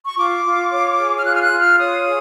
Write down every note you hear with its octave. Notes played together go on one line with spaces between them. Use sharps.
C#6
F4 D6
F4
C#5
G#4
F6
F4 F#6
F6
F#6
F4
F6
C#5 D#6
G#4